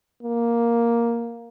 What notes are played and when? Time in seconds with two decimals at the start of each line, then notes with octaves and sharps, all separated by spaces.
0.23 A#3